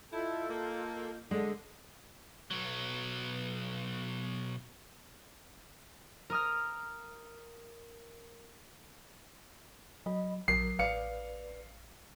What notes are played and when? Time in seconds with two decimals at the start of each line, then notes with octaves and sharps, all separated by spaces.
0.13 E4 F4 A4 D#5 G6
0.49 A#3
1.31 D3 G#3 A4
2.51 B1 F#3
6.30 A#4 D#6 F6
10.06 F#3 D#5 B5
10.48 A#1 F#3 A#4 C7
10.79 A1 B4 D5 F5 C#7